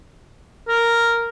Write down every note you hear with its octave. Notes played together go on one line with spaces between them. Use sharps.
A#4